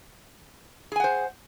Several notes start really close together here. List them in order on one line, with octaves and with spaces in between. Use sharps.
G#4 G#5 F#5 C5